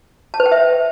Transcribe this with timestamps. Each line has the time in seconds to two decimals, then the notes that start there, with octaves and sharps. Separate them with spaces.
0.34 A5
0.40 B4
0.46 G5
0.52 E5